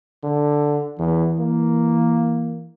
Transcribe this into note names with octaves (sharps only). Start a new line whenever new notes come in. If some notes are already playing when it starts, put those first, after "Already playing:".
D3
E2 E3
A#3